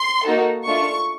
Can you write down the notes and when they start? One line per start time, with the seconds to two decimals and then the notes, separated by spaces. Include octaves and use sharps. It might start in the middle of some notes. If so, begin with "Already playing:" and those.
Already playing: C6
0.26 A#3 D#4 F#4 A4
0.67 A3 D4 F4 A4 C#6